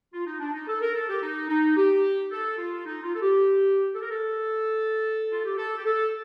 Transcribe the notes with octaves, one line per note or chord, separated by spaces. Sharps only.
F4
D#4
D4
D#4
A4
A#4
A4
G4
D#4
D#4
G4
A4
F4
D#4
F4
A4
G4
A4
A#4
A4
F4
G4
A4
G4
A4